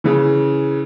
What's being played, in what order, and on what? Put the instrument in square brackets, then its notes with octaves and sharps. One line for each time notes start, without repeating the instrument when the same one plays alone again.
[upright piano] C#3 E3